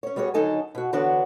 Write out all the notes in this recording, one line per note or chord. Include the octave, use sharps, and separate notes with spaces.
C#4 C#5
G3 B3 F#4 G#4 C#5
D#2 D3 F#3 D#4 A4 G#5
B2 F#4
D3 E3 B3 D4 F#4 C#5